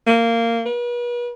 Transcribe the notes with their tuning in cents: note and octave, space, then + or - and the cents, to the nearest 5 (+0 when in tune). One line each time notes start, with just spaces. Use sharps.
A#3 -15
B4 -40